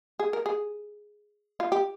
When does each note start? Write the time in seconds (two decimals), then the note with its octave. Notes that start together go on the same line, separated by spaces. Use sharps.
0.19 G#4
0.33 A#4
0.46 G#4
1.60 F4
1.72 G4